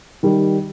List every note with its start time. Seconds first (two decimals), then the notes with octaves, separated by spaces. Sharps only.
0.23 D#3 G3